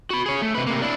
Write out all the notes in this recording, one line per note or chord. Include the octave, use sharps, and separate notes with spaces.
F#4 B5
G#4 C#5
A3
C3 B4
C3 A#3
D4 E4